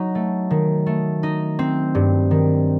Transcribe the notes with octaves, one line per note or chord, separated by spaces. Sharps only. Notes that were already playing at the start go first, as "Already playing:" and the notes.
Already playing: F#3 D#4
A3
D#3
A3
D#4
C4
G2
D#3